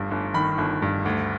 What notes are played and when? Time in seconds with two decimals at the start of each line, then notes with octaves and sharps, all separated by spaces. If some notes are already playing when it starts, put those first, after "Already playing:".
Already playing: G1 G2
0.11 G1
0.34 D#3 B5
0.58 G1
0.82 G2
1.06 D2